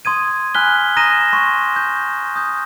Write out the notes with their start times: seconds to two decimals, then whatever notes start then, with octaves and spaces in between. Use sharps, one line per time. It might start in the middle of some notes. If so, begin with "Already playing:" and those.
0.05 C6 D#6 G#6 D#7
0.55 G#5 B5 F6 F#6 B6 G7
0.96 A#5 D#6 F#6 A#6 D#7 E7
1.33 C6 C#6
1.76 G6
2.36 D#6 G6